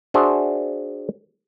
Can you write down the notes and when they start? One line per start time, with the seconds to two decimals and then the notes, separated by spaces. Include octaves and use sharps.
0.14 D4 F#4 G#4 C5 E5